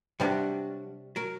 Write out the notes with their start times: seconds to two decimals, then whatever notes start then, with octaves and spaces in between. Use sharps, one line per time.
0.20 C3 F#3 G3 D4 F#4
1.16 F#3 A#4